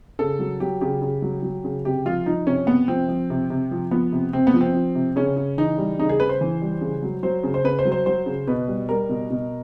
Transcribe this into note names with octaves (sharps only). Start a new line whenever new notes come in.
C#3 A4
F#3
F#3 G4
C#3 G4
C#3
F#3
F#3
C#3
C3 G4
F3 F4
F3 D#4
C3 C#4
C3 B3
F3 C4
F3
C3
C3
F3
F3 B3
C3
C3 C4
B3
F3
C4
F3
C3
C#3 C#4
C#3
E3 D#4
G3
C#3 D#4
G#4
C#3 B4
C5
E3
G3
C#3
F#3
F#3 C5
C#3
C5
C#3 B4
C5
F#3
C5
F#3 C5
C#3
B2 B4
G3
G3 A#4
B2
B2